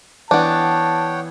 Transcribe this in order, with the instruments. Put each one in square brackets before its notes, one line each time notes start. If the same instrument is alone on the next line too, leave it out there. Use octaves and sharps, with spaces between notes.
[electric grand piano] E3 [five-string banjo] B3 D4 [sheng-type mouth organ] C#5 F#5 G5 [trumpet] A5